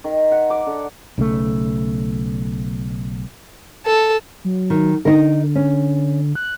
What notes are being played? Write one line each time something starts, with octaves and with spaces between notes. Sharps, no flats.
D#3
F#5
D6
D3
B1 C#3 F3 A3
A4
F#3
D#3
D3 D#4 A#4
C#4
F#6